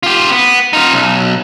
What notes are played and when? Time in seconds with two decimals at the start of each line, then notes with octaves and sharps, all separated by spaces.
0.03 F4 G4
0.32 B3
0.73 D#4 F4
0.94 B1